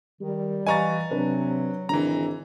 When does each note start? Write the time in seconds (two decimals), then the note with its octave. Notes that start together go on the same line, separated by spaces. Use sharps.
0.21 D#3 G3
0.67 E3 D#5 F5 G#5 A#5 C#6 A6
1.11 C3 F#3 D4 B4
1.89 G#1 D3 E3 A#5